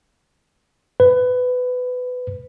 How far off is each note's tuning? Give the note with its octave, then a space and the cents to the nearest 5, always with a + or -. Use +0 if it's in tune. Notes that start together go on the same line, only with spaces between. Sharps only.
B4 +20